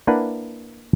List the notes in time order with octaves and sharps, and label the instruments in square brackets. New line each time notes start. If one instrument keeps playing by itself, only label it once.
[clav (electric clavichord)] A#3 D4 E4 B4 F#5